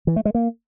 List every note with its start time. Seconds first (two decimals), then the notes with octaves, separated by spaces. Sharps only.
0.07 E3
0.16 A3
0.25 G#3
0.35 A#3